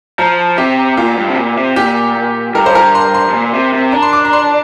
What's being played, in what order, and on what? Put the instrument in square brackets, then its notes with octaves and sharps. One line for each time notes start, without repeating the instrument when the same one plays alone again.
[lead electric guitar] F3 [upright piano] A#5
[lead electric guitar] C3 [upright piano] G4
[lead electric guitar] A#2 [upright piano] F4
[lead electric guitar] G2
C3
A#2
C3
[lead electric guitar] A#2 [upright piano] G4
[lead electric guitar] G2 [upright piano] A#4
[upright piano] C5
A#4
C6
C6
[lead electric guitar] G2
A#2
C3
C3
[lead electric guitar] D4 [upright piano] A#5
[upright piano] C6
D6
A#5
C6